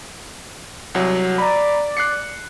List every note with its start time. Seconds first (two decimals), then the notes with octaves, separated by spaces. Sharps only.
0.95 C2 F#3
1.38 D5 A#5 B5
1.97 F#6 C7 C#7